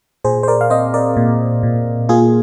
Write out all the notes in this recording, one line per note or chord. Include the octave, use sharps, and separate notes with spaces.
A#2 G#4 C5
C5
A#4 D5
F5
C4 C5 D#5
A#4 D5
A#2
A#2
A#3 F4 G#4